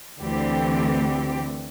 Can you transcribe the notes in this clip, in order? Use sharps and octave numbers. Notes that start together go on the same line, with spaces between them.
D2 D3 E3 A3 C4 G4